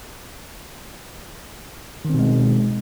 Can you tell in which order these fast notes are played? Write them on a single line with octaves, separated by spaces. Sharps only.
D#3 C4 B2 G#3